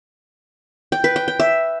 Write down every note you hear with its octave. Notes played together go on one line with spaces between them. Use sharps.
G5
B4
G5
G5
E5